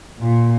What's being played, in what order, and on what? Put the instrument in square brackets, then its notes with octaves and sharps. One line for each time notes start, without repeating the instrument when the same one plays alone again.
[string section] A#2